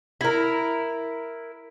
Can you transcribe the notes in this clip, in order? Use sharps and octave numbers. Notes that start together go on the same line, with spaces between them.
E4 A#4